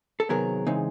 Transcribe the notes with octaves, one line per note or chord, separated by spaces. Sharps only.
A4
C3 D#3 F#3 B3 G#4 A#4
C#3 E3 G#3 C4 D#4